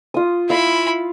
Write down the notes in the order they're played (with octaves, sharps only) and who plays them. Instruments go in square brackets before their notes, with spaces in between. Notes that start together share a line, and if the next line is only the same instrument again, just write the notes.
[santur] F4 D#6
[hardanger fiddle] E4 B5 [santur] F5